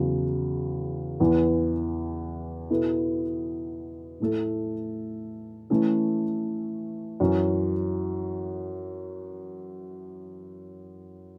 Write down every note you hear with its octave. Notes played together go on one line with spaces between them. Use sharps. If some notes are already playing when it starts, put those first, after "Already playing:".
Already playing: E2 C#3 F#3
E2 E3 B3
B2 B3 E4 A4
A2 A3 E4 A4
E3 A3 C#4 E4 A4
F#2 E3 C#4 E4